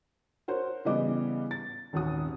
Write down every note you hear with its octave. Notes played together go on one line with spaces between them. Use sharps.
F#4 A#4 C5 C#5
C#3 E3 G3 B3 D#5 D6
A6
D#1 G#1 D#2 F#4 D#6